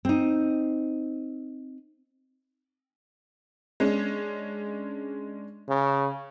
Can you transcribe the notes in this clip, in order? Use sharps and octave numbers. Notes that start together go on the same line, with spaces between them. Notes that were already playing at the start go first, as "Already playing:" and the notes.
C4 D#4
G#3 C#4 D4
C#3